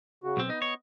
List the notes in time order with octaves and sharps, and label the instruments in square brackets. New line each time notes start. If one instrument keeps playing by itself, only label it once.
[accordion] C#3 F#4
[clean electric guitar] B1 C4
[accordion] B3 D#5 [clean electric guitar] D#4
[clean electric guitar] C#5